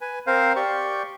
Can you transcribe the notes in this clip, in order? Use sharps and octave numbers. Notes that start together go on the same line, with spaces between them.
B4 G#5
C4 A#4 C5 F5
G4 D5 G5 C#6